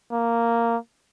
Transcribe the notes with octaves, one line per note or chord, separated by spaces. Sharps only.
A#3